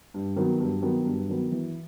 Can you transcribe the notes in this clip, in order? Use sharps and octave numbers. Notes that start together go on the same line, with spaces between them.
G2
D#3 F#3 B3
G2
D#3 F#3 B3
G2
D#3 F#3 B3
E3